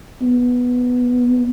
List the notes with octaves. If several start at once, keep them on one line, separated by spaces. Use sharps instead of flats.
B3